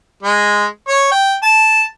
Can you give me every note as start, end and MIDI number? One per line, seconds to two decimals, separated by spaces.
0.23 0.65 56
0.88 1.08 73
1.12 1.34 79
1.43 1.84 81